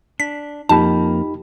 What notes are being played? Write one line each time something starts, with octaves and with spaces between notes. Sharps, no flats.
D4 B6
F2 F3 A#3 D#4 G4 A5 B5